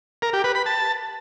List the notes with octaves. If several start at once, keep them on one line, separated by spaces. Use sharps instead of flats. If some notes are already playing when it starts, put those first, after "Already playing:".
A#4
G4
B4
B5
A5